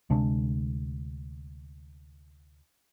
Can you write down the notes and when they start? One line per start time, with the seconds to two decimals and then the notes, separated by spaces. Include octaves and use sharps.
0.10 D2 C3 G#3 D4